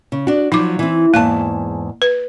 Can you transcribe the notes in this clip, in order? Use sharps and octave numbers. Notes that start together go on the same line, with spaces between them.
C#3
D4 F#4
F3 F#3 D#4 D6
E3 C4
E2 G#2 A#3 A5
B4